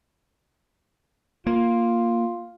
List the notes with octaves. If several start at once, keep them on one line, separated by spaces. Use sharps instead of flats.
A#3 F4